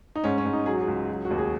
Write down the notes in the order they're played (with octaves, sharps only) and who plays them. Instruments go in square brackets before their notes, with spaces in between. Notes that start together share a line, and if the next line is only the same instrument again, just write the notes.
[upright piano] D#4
G#2 C#4
C#4
G#2
D#4
F#3 G#4
F#4
G#4
C#2
F#3
F#4
D#2
G#4